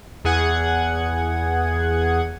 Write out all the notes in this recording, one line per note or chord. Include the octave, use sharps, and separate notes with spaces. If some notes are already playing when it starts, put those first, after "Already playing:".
E2 G#4 F#5 G#6